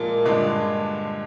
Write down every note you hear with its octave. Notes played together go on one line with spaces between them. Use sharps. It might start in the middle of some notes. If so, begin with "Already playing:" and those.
Already playing: A#2 F3 G#3 A#3
G2 D3 G#3